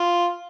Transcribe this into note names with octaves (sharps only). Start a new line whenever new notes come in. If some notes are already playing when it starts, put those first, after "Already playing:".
Already playing: F4